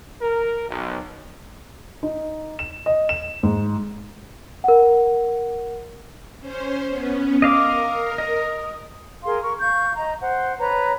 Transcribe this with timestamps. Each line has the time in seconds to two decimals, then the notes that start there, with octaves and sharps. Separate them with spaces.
0.22 A#4
0.68 B1
2.03 D#4
2.59 E7
2.86 D#5
3.09 E7
3.43 G#2
4.64 A#4 F#5
6.40 C#4 C5
6.89 B3 C#4
7.42 A#4 D#5 F5 D6
8.18 D#5
9.25 G#4 A#4 F5 C6
9.42 A#4 C#6
9.60 F5 C#6 G6
9.96 D#5 A#5
10.21 C5 F#5
10.59 B4 C#5 A#5